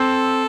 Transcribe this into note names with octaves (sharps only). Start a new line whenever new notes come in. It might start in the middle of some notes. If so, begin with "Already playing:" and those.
Already playing: C4 A4